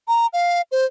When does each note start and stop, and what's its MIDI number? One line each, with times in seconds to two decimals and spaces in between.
0.08 0.27 82
0.33 0.62 77
0.72 0.86 72